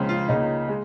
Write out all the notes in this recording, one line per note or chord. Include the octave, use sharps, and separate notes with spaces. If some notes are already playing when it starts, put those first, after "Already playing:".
Already playing: C#2 C#3 F3 G#3
F4
C#2 C#3 A#3 D#4
G#3